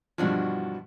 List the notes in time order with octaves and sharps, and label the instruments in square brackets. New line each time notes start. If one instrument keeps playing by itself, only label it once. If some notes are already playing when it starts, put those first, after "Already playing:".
[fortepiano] G2 B2 F3 [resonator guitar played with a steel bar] E3 D4 F#4